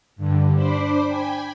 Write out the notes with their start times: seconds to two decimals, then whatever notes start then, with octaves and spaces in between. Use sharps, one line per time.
0.16 G2 D3
0.54 D4 C5 B5 D6
1.07 G5 G#5 B5